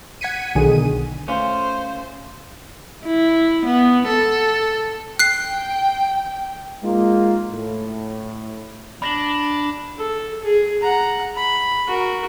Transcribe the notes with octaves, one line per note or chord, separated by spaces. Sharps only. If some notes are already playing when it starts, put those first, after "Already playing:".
F#5 G#6 B6 C#7 D#7
B1 D3 D#3 G#4 D#7
A3 C#4 F4 C5
E4
B3
A4
G5 F#6 C7
G#3 A#3 D#4 F4
A2
D4 B5 A#6 F#7
A4
G#4
F#5 A#5
B5
F#4 A#4